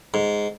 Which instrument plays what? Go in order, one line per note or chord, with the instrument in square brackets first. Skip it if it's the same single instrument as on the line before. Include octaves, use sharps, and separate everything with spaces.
[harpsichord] G#2